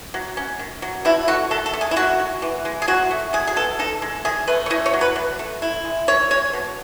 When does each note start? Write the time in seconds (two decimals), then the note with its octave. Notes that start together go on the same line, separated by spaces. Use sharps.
0.14 F#3
0.37 C#4
0.59 D#3
0.82 F#3
1.05 B2 E4
1.28 A3 F#4
1.51 D#3 A4
1.66 A4
1.73 A3
1.81 G#4
1.91 E4
1.96 D#3 F#4
2.19 F#3
2.42 E3
2.65 G#3
2.82 G#4
2.87 F#3 F#4
3.11 A3
3.33 F#3 G#4
3.47 G#4
3.56 B3 A4
3.79 D#4 A4
4.02 G#3
4.25 D#3 G#4
4.48 A3 B4
4.66 C#5
4.70 E4 D#5
4.86 C#5
4.93 F#3
5.01 B4
5.16 B2
5.39 A3
5.62 E4
5.85 G#3
6.08 D#3 C#5
6.30 G#3 C#5
6.53 B2